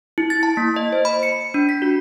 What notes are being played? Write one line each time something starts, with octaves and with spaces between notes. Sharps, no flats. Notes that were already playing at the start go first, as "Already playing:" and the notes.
E4
A6
A5
A#3
D#5
C5
B5
C#7
D4
B6
F#4